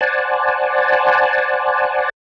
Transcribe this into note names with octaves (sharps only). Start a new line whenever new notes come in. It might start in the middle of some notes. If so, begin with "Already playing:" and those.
C5 D5 F#5 G#5 A5